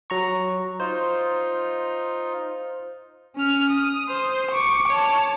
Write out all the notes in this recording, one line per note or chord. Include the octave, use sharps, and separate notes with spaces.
F#3 A#5 C#6
D#4 F4 C5
C#4 F6
D#6
C5
C#6 D6
C#5 A5